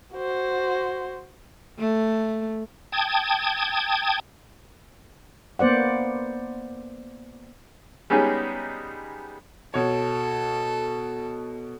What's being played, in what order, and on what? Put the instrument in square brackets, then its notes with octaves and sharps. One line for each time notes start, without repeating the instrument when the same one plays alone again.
[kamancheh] F#4 C5
[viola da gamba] A3
[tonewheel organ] G5 A5 D#6 G#6
[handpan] A#3 B3 C5 D5 F#5
[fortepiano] G3 G#3 B3 C#4 D#4 G#4
[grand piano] B2 C#5 [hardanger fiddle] A4